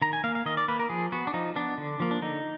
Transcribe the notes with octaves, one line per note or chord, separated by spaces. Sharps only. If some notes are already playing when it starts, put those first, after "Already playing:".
D#3 A#5
G#5
A#3 F5
F5
D#3 D#5
D5
A#3 B4
A#4
F3 G#4
B3 F#4
D4
F3 D#4
B3 D4
D3
F3 A#3
D4
D3 D#4